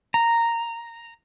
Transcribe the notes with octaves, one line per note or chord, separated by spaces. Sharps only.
A#5